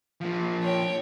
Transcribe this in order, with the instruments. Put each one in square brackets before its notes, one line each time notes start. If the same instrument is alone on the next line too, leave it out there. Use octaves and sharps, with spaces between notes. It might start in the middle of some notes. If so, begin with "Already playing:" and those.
[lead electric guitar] F3 A#3
[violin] C#5 G5